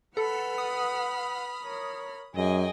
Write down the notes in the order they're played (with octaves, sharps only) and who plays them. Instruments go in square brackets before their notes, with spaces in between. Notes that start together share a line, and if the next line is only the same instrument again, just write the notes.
[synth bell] A4 [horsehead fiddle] B4 F#5 [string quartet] B5 F6
[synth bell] D#6
[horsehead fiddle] A#4 C#5
[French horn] F#2 [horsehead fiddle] G#4 [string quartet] D#5 G5 G#5